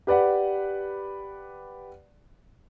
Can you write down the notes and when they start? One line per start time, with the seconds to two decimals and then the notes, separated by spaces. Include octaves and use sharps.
0.07 G4 B4 D5 F#5